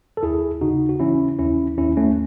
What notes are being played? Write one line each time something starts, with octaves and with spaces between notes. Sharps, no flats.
A4
D#2 E4 G#4
C#3 D#4 F#4
F#4
E3 C#4 E4
D#2 C#4 E4
D#2 C#4 E4
A3 C#4